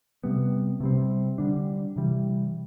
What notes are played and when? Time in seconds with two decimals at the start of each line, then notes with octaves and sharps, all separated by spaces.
0.24 C3 G3 B3
0.80 C3 G3 C4
1.38 D3 G3 D4
1.96 C3 E3 G3